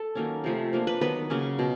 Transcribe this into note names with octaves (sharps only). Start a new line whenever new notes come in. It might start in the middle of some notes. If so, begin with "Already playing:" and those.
Already playing: A4
D#3 F#3 A#3 C#4
C3 F3 A3
F3 A#3 D4
B4
D#3 F#3 B3 B4
C#3 F#3 A#3 C#4
B2